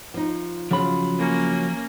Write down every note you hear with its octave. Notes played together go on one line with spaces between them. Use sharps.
F3 D#4
C#3 F3 F#3 F4 B5
A#3 C#4